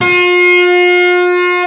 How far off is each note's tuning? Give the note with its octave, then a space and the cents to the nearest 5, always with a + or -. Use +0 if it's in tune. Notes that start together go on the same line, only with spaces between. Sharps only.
F4 +40